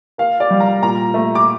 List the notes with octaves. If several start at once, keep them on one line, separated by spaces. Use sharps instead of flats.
A#3 F5
D5
G3
A#5
A#2 A#5
A3
D6